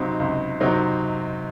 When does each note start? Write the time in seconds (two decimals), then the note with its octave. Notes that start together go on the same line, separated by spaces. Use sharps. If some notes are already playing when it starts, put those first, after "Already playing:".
Already playing: C#2 C3 F#3 C4 D#4
0.20 C#2
0.60 C3 F#3 C4 D#4